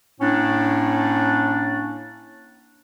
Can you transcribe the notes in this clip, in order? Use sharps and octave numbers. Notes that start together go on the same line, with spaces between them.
A2 A#3 C#4 D4